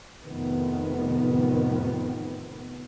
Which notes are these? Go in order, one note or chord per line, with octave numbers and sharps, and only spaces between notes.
F1 F2 A2 C3 D#3 B3